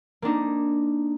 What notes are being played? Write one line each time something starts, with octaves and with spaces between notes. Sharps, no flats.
A#3 C4 D4 D#4